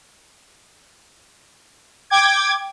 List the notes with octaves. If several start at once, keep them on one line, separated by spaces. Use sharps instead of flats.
G5 D6 G#6